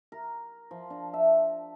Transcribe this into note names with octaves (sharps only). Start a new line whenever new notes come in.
A#4
F3
D4
E5